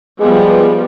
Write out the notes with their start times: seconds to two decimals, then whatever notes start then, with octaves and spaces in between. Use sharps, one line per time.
0.20 F3 G3 G#3 B3